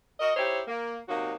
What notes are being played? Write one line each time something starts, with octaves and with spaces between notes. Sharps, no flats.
F#4 A#4 D#5
D#4 E4 G4 C5 C#5
A#3
C3 F#3 A#3 D#4 F#4